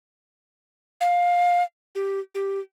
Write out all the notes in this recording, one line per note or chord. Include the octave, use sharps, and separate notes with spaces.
F5
G4
G4